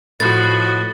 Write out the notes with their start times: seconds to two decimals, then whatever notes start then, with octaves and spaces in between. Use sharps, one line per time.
0.20 A2 F3 F#4 B4 D#5 A6